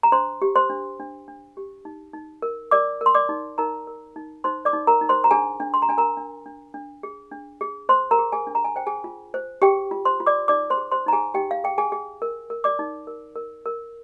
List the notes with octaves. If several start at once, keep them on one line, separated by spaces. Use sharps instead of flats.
A#5
D4 C5 C6
G4
C5 C6
D4
D4
D4
G4
D#4
D#4
A#4
A#4 D5 D6
A#4
C6
D5 D6
D#4
D#4 A#4 A#5
A#4
D#4
D#4 C5 C6
D5 D6
D#4
A#4 A#5
D#4
C5 C6
A#5
D4 G#4 G#5
D4
C6
A#5
D4 G#5
A#4 A#5
D4
D4
D4
G#4
D4
G#4
C5 C6
A#4 A#5
G#4
G#4 G#5
D4
A#5
G#5
C5 G5
G#4 G#5
F4
C5
G4 G#4 G5
F4
C5 C6
F4
D5 D6
D#4 D5 D6
C5 C6
G#4
C5 C6
D#4 A#5
G#4 G#5
D#4 G4 G5
F5
G#4 G5
G#4 G#5
G#4
A#4
A#4
D5 D6
D#4
A#4
A#4
A#4